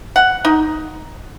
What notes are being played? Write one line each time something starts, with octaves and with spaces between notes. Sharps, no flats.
F#5
D#4